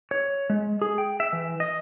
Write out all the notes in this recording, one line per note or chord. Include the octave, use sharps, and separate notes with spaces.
C#5
G#3
G#4
G5
E5
E3
D#5